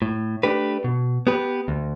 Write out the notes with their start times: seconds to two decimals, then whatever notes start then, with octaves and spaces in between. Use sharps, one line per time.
0.02 A2
0.43 A3 D4 G4 B4
0.84 B2
1.27 B3 G4 B4
1.68 D2